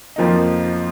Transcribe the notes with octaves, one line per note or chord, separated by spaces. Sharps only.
F2 F3 A#3 D#4